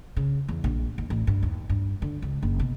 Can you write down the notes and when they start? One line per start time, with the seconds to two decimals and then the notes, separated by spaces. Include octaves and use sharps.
0.17 C#3
0.48 E2
0.64 A#1
0.98 D#2
1.10 A1
1.27 G2
1.43 D#2
1.69 G2
2.02 D3
2.22 C#2
2.43 F#1
2.59 B2